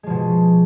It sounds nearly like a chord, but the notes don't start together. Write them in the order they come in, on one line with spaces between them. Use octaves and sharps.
G#3 F3 B2